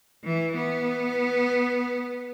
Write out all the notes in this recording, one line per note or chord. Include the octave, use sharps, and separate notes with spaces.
E3
B3